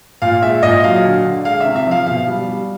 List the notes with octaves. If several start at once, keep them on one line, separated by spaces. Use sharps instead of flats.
A#2 F5
G#3 E5
A#2 D#5
F#3 F5
D3
D3
G#3 F5
C3 E5
E5
F3 F5
B2 F5
G3
G3